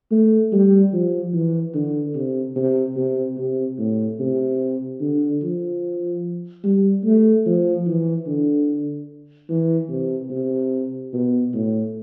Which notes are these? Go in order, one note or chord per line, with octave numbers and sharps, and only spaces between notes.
A3
G3
F3
E3
D3
C3
C3
C3
C3
A2
C3
D3
F3
G3
A3
F3
E3
D3
E3
C3
C3
B2
A2